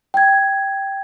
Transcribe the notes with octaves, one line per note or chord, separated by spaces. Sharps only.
G5 G#6